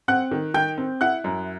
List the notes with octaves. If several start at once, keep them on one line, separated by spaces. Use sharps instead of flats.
C4 F#5 F#6
D#3
D#3 G5 G6
C4
E4 F#5 F#6
F#2